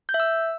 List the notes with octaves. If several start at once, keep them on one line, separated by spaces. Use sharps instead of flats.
G6
E5
E6